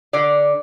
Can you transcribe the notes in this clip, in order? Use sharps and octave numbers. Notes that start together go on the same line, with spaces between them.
D3 D5